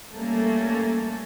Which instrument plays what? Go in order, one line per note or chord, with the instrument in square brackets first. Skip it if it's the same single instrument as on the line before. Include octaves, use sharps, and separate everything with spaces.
[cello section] G3 A3 A#3 C#4 A4